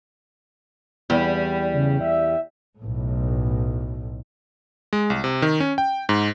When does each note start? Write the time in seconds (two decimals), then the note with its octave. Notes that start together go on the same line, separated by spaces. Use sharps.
1.10 E2 G3
1.73 C#3
2.01 E5
2.81 B1 A2
4.93 G#3
5.10 C2
5.24 C3
5.42 D#3
5.60 C#4
5.78 G5
6.09 G#2